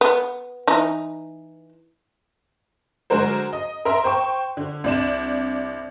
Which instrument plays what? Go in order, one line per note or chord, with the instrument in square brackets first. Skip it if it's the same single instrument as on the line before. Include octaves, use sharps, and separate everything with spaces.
[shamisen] B3
E3 D#4
[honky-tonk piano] D3 F#3 G#3 F#4 A#4 C5
D#5
A#4 E5 A#5 C6
C5 G5 C#6
D3
C2 D4 E7